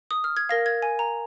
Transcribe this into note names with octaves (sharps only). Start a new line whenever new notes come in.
D#6
F6
G#6
A#4 F5 A#6
G#6
G#5
A#5